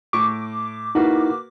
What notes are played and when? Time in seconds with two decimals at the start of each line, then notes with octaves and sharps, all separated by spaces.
0.13 A2 C#6 D6
0.95 A#3 D#4 E4 F#4 B4